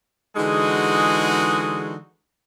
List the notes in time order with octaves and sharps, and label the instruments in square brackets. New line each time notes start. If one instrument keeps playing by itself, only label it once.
[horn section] D3 E3 G#3 D#4 F#4 G#4